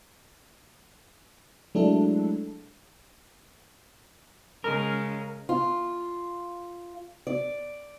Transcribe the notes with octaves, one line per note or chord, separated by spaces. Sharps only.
F#3 G#3 A3 D4 E4 A4
C#3 G#3 C#4 A#4
F4
D5